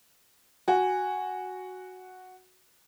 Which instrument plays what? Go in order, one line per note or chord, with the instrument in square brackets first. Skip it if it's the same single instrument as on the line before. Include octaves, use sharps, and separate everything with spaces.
[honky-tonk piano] F#4 [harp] G#5